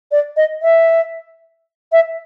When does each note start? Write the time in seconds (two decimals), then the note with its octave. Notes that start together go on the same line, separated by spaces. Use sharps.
0.12 D5
0.37 D#5
0.62 E5
1.92 E5